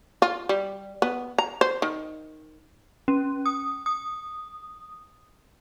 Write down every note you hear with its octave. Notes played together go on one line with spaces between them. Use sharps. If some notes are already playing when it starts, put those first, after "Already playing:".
F4
G3
B3
A#5
C5
D#3
C#4
D#6
D#6